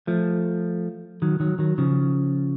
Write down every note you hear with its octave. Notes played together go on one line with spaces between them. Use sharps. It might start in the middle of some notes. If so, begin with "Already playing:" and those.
F3 A3
D#3 F#3
D#3 F#3
D#3 F#3
C#3 F3